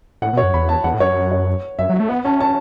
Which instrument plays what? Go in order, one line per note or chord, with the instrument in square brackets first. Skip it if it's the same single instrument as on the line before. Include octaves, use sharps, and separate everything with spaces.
[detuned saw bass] A2 [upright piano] F#5
[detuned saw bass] B2
[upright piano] C#5
[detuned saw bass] F#2
[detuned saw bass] E2 [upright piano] B5
[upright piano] A5
[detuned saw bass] E2 [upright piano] F#5
[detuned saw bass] A2
[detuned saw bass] F#2 [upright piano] C#5
[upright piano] C#5
[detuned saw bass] F#2 [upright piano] E5
[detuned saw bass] F#3
[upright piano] E5
[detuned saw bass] A3
[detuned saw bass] B3 [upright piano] F#5
[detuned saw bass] C#4 [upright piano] A5
[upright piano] A5